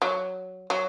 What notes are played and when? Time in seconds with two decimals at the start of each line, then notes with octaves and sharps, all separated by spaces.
0.02 F#3
0.70 F#3